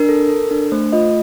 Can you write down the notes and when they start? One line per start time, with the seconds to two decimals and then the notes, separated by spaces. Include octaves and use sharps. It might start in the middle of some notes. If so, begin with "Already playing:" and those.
Already playing: D4 A#4
0.09 A4
0.29 A4
0.51 D4
0.72 A3 C5
0.93 F4 D#5